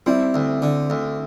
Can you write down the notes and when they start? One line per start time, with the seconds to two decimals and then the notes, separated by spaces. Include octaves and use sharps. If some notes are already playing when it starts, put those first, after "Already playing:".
0.06 G3 C4 E4
0.34 D2
0.62 D3
0.90 D2